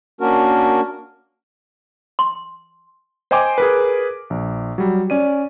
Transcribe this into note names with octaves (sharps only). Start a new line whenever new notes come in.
A#3 C#4 D4 F#4 A#4
C6
C5 D#5 G5 G#5 C6 D6
G#4 A#4 B4
A#1
F#3 G3
C#4 D5 D#7